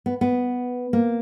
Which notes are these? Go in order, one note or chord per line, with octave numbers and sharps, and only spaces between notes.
B3
B3
A#3